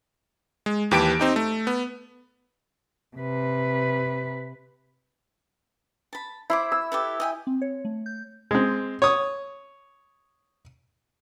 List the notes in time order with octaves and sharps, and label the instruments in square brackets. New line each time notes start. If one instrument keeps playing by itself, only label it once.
[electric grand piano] G#3
D#2 E3 G4 B4 A5 D7
C4 D#4 G4
A3
B3
[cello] C3 B4
[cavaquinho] A5 B5
[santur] E4 [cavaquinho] C5 B5 D6
[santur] E6
[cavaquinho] G4 A4 B4
D#5 G5 G#5
[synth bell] C4
C#5
A3
G6
[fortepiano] G#3 C4
C#5 D#6